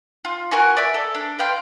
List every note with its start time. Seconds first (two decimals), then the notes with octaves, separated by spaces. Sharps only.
0.25 F4
0.51 F#4 A#4 G#5 C#6
0.77 D5 E5 G#5
0.94 A4
1.15 D4
1.39 B4 F5 G5 C6